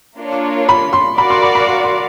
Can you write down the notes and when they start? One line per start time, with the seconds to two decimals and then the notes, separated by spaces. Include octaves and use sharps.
0.19 A#3 D4 F4 A#4 C#5
0.69 B5
0.93 C6
1.18 F#4 A#4 D5 F5 B5
1.30 C6
1.42 B5
1.55 B5
1.67 C6
1.84 C6